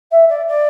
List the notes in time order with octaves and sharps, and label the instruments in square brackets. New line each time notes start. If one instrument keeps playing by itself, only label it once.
[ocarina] E5
D5
D5